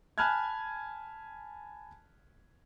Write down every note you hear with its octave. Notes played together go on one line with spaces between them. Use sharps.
G#5 A5 B5 F6 F#6 G#6